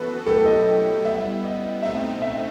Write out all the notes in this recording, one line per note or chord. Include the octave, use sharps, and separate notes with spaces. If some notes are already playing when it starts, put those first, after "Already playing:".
Already playing: E3 B3 F#4 A4 B4
B2 F#3 A3 E4 G4 A4
D#5
G3 B3 E4 E5
D#5
B2 A3 C4 D#4 E5
D#5
E5